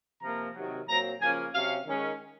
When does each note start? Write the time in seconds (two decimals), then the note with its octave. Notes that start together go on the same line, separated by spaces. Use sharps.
0.21 C3 F3 A#3 A#5
0.54 C3 D#3 F#3
0.87 A#2 F#3 C4 A#5
1.20 C#3 F3 A#3 C#4 G#5
1.53 C3 F#3 C#4 F5
1.86 D#3 G#3 C#4